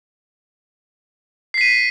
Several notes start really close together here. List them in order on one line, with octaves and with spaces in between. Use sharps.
C7 B6 D#7